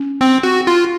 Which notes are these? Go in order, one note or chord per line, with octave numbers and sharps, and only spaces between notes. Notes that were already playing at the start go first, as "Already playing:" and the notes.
Already playing: C#4
C4
F#4
F4